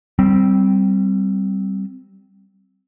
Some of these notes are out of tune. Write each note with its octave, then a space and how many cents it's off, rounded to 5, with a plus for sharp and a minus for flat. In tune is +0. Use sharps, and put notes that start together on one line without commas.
G3 -15 C4 +0